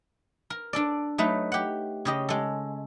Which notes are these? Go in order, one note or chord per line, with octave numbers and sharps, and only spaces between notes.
A#4
D4 A4 D5
F#3 A3 D#4 B4
G4 F#5
C#3 G4 D#5
G#3 A4